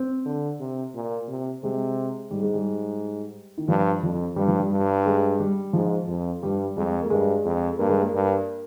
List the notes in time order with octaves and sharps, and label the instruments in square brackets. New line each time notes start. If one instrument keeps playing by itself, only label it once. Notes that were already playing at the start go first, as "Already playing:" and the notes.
Already playing: [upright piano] C4
[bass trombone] D3
C3
A#2
C3
[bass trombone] C3 [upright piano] G#3
[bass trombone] G#2 [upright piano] G3
[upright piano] G#3
G3
D#3
[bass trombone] G2 [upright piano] F3
[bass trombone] F2 [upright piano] F3
[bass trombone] G2 [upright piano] G3
[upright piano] F3
G3
[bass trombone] G2
[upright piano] G#3
G3
[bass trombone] G#2 [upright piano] F3
[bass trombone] F2
[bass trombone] G2 [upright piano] G3
[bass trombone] F2 [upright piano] G#3
[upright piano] A#3
[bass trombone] G2 [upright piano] G#3
[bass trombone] F2
[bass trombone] G2 [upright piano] A#3
[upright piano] G#3
A#3
[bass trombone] G2